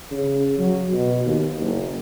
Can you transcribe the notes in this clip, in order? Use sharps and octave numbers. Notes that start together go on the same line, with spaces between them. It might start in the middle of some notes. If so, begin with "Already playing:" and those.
C#3
F#3
B2
D#2
F#1